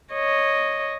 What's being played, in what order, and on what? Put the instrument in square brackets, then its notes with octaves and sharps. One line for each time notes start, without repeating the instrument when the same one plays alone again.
[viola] C#5 D#5